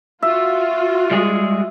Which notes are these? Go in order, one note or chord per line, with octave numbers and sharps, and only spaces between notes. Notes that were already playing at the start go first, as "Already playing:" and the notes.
F4 F#4 E5
G3 G#3 G#4